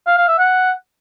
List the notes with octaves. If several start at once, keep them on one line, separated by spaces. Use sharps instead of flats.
F5
F5
E5
F#5